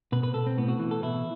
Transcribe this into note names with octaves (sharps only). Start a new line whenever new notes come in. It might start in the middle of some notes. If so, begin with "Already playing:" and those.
B2 B4
B4
B2 A4
C4
A2 B3
F#4
E3
A4
B2 E4